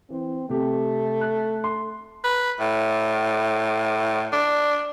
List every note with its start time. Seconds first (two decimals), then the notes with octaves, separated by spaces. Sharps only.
0.10 E3 C4
0.49 C3 A3 G4
1.21 F#6
1.64 C6
2.24 B4
2.60 A2
4.33 D4